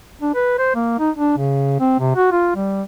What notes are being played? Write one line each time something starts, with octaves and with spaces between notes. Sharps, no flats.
D4
B4
C5
A#3
D#4
D4
C#3
C4
C3
F#4
F4
G3